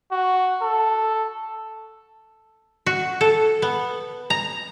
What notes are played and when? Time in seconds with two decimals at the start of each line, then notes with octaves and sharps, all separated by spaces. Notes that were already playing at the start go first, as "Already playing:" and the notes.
0.12 F#4
0.63 A4
2.86 F#4
3.21 A4
3.62 B3
4.30 A#5